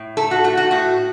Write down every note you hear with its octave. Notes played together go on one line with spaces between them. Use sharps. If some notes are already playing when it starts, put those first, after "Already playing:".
Already playing: A2
A3 A4
F#4
A3 F#4
F#4
A2 F#4